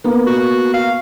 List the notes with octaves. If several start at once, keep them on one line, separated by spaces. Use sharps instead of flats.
A#3 B3
F#4
F5